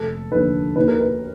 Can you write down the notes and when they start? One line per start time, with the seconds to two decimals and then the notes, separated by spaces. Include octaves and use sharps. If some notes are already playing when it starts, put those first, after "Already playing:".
Already playing: F1 A4
0.31 D#2 D3 F3 B4
0.76 D#2 B4
0.88 A#4
1.00 B4